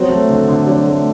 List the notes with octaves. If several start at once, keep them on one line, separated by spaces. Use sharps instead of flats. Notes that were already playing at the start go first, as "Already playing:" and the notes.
Already playing: F#3 C4
A3
D3
D3
F#3 D4
A3